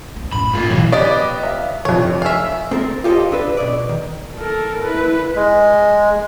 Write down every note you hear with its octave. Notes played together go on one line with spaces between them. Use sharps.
B3
F#2 A2 B5
G#2 F4
B2 E3 F#3
B3 G4 D5 D#5
E5 F5
F1 F2 C#5
E5 F5 G#5 E6
C4 A4 A#4
F4 G4 A4 B4 C5 D#5
D4 A4 B4
B2 D5
D#3
A4 A#4
E4 B4
G#3